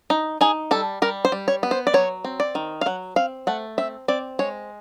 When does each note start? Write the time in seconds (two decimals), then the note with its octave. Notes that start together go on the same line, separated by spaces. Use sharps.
0.10 D#4
0.41 D#4 G#4
0.71 G3 A4
1.02 G3 A#4
1.25 C5
1.32 G3
1.48 C#5
1.63 B3
1.71 C5
1.87 D5
1.94 F#3 C#5
2.25 C4
2.40 D5
2.55 D#3
2.81 F5
2.86 F#3 F#5
3.16 C4 F5
3.47 A3 F#5
3.78 C4 E5
4.08 C4 D5
4.39 G#3 C#5